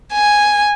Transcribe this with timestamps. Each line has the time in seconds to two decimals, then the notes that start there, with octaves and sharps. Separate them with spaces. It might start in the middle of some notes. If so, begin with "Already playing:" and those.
0.13 G#5